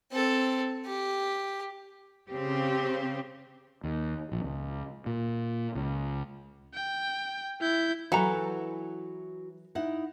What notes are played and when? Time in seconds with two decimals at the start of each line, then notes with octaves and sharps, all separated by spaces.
0.12 C4 A4
0.86 G4
2.29 C#3 C4 G4
3.84 D#2
4.32 A#1
4.44 C#2
5.06 A#2
5.75 C#2
6.74 G5
7.61 E4 G6
8.12 E3 F#3 E4 F#4 A4 A#5
9.75 D#4 E4 F#5